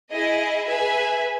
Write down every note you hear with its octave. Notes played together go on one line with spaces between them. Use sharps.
E4 G#4 D#5
G#4 B4 E5 G#5